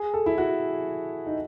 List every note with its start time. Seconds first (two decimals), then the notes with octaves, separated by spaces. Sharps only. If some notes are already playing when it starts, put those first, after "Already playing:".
Already playing: G#4
0.14 A4
0.26 E4
0.38 F#4
1.27 D#4